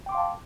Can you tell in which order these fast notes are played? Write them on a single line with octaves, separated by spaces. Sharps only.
G5 D6 C6 F5 A5